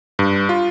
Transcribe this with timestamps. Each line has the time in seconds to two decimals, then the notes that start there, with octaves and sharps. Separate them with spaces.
0.19 G2
0.49 F4